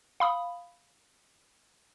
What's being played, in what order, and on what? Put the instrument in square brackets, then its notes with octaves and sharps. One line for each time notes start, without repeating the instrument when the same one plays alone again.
[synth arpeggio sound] F5 B5 D#6